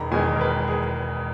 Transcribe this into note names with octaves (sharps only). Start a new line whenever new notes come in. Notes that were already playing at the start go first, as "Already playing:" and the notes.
Already playing: E1 E2 D#3 G#3 A#5 B5
E1 E2 D#3 G#3 G#5
A#4
B4
G#4